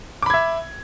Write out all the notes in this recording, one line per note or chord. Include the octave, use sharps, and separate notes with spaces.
E5 B5 D6 G#6